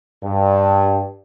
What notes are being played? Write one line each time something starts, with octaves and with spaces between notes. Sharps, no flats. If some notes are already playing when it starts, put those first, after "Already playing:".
G2